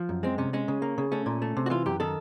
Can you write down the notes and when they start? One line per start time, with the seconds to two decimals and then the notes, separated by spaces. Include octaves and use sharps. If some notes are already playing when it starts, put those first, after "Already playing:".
Already playing: F3
0.09 F#2
0.23 G#3 C4
0.38 C3 C#4
0.53 G#3 C#4
0.68 C#3
0.82 A#3
0.98 C#3
1.12 A3 C#4
1.26 A#2
1.42 A3
1.57 C3
1.66 F#4
1.70 E3 F4
1.86 F#2 G4
2.00 D#3 A4